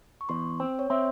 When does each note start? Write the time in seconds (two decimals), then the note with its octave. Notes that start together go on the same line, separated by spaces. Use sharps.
0.21 C#6
0.29 E2 C6
0.60 C4
0.79 C#5
0.90 C4 E5